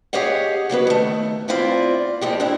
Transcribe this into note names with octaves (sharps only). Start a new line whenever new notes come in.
G4 G#4 C#5 D#5 F5 F#5
C#3 F#3 B3 B4
D#3 A3
B3 C4 E4 F4 D5
F2 G#3 G4
A#2 G#3 D4 E4